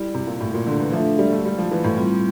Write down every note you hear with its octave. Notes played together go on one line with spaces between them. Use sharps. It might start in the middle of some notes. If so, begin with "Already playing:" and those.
Already playing: G3 E4
C3
A#2
A2
A#2
D3
E3
F3 A3 D4 A4 E5
G3
A3
G3
F3
E3
A2
G3 C4 F4